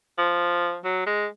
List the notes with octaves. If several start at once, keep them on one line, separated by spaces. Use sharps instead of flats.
F3
F#3
G#3